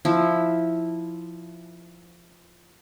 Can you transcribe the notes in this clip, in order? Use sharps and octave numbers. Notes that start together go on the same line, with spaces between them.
F3 E4